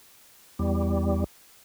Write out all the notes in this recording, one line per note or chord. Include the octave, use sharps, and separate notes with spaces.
E2 G3